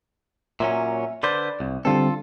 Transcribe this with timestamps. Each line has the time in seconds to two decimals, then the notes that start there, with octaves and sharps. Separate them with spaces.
0.60 A#2 F#3 C#4 E5
1.23 D3 B4 C5 D5
1.60 C2
1.85 D3 G3 C4 F4 A4